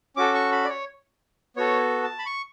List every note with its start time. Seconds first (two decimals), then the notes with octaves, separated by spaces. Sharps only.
0.17 C#4 F#4 A4 D6
0.34 C#6
0.52 B5
0.65 D5
0.69 C#5
1.56 B3 F#4 A4 C#5
2.03 A5
2.19 B5
2.26 C#6